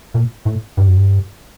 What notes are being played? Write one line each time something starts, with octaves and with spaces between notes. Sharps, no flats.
A#2
A2
G2
F#2
G2